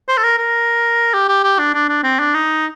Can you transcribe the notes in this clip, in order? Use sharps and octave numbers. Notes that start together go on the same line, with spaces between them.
C5
A4
A#4
A#4
G4
G4
G4
D4
D4
D4
C4
D4
D#4